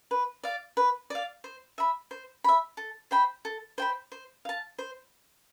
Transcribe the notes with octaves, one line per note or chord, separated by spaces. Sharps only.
B4
D5 F5
B4
D5 F5
C5
E5 B5
C5
E5 B5
A4
C5 G5 B5
A4
C5 G5 B5
C5
F5 A5
C5